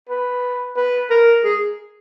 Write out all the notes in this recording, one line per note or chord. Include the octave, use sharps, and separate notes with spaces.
B4
B4
A#4
G#4